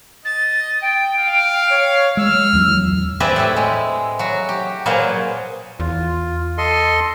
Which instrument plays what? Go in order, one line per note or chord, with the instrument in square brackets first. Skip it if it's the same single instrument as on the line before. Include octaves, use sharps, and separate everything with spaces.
[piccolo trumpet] D#5 [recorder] A6
[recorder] G5
[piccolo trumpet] F5
[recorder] C#5
[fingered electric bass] G#3 [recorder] E6 [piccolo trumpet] F6
[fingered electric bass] D1 E2 F#3
[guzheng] C4 G4 G#4 B4 D5 E5
A2 E4 G4
G#3
F#3 F#4
G4
A#2 F#3 G#4 B4 C5 F5
[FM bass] E2 [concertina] F4
[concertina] A4 D#5 C6